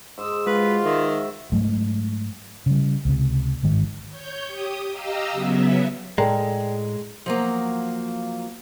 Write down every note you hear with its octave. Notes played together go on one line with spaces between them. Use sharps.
G#2 C5 D#5 E6
G#3 F4 F#4 B4
D#3 E5
G#2 F#3 G#3 A3
C#3 G3
C#2 C3
G1 G#2 D#3
C#5 G6
G4 D#6
G4 D#5 F5 A#5 E6
C#3 F#3 B3 E5
A2 G#3 A4 A#4 D5 G5 A#5
F3 F#3 A#3